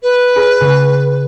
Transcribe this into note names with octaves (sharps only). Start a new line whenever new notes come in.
B4
G#4 B5 D7
C#3